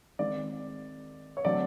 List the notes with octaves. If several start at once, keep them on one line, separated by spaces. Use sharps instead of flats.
D#3 G#3 C4 D5
C#5
D3 F#3 A3 C4 D5